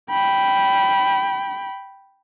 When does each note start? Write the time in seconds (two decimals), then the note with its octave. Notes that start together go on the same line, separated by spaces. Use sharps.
0.11 G5 B5